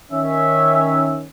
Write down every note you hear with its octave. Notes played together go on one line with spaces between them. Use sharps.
D#3 C#4 E5